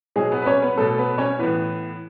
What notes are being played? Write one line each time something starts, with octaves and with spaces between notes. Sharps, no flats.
B2 F#3 G#3 G#4
B3 B4
B4
C#4 C#5
B3 B4
B2 F#3 A3 A4
B3 B4
C#4 C#5
A2 E3 B3 B4